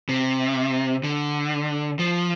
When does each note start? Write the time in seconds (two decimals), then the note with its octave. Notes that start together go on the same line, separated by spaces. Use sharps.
0.09 C3
1.03 D3
1.99 F3